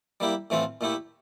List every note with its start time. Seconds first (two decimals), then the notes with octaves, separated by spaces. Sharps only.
0.20 G3 A#3 E4 G4
0.50 A2 E3 A3 C4 F4
0.81 A#2 A3 E4 G4